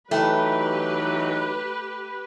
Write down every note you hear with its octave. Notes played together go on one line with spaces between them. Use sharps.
E3 F#3 A3 D#4 E4 G4 B4 G5